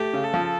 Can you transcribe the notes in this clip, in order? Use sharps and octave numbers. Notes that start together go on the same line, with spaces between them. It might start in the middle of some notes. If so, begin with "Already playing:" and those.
Already playing: A3 G4
C#3
A4
F3